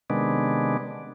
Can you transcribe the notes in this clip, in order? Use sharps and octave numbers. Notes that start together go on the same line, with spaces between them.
C3 D#3 G#3 B3 D4